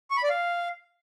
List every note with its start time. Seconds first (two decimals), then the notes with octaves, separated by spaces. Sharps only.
0.10 C#6
0.17 B5
0.23 D5
0.29 F5